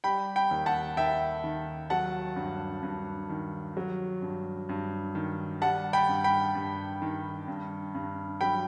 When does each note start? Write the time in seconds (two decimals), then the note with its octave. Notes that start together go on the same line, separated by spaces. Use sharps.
0.04 G3 G5 B5
0.36 G5 B5
0.51 D#2
0.66 F#5 A5
0.97 D#2 E5 G5
1.44 D#3
1.90 F#3 F#5 A5
2.36 G2
2.83 G2
3.30 D#3
3.77 F#3
4.22 G2
4.69 G2
5.15 D#3
5.62 G3 F#5 A5
5.93 G5 B5
6.09 G2
6.24 G5 B5
6.55 G2
7.02 D#3
7.48 G2
7.95 G2
8.41 F#3 G5 B5